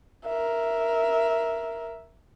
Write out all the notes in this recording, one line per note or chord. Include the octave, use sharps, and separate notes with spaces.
A#4 E5